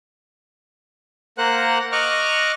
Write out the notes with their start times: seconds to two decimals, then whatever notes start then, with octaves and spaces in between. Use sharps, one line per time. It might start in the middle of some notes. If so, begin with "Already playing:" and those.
1.38 A#3 A#4 C5 F#5 F#6
1.92 D#5 C#6 D6 F6 F#6